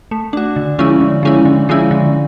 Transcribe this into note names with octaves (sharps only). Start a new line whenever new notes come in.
A3
D4 F#4
D3
F3 G#3 C#4 E4
D3
F3 G#3 C#4 E4
D3
F3 G#3 C#4 E4
D3